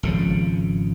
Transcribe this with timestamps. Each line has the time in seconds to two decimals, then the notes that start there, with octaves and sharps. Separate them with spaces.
0.03 G#1 C#3 F3